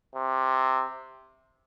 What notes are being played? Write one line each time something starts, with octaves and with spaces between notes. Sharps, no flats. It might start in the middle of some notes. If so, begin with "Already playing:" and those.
C3